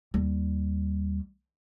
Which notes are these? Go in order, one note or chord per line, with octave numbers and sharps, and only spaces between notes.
D#2 G3